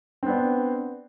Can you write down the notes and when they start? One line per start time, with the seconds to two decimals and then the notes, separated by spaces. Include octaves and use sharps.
0.23 C4
0.26 B3
0.30 D4